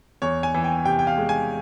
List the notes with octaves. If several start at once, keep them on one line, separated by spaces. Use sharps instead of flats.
E2 C#5
G#5
E3
G5
C3 G5
G5
F5
G#3
G#5